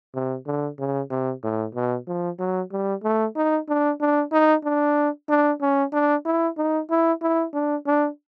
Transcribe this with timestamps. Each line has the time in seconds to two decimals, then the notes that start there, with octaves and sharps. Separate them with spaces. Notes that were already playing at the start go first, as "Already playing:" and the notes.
0.14 C3
0.47 D3
0.79 C#3
1.11 C3
1.44 A2
1.75 B2
2.07 F3
2.39 F#3
2.72 G3
3.04 A3
3.36 D#4
3.69 D4
4.01 D4
4.32 D#4
4.64 D4
5.29 D4
5.61 C#4
5.93 D4
6.25 E4
6.58 D#4
6.90 E4
7.22 E4
7.54 D4
7.86 D4